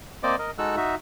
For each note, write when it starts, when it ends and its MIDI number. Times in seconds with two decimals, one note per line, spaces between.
0.23 0.36 58
0.23 0.36 60
0.23 0.36 72
0.23 0.36 74
0.23 0.36 75
0.23 0.36 86
0.39 0.51 70
0.39 0.51 75
0.58 0.76 56
0.58 0.76 63
0.58 0.76 66
0.58 0.76 69
0.58 0.76 88
0.58 0.76 90
0.77 0.95 63
0.77 0.95 66
0.77 0.95 76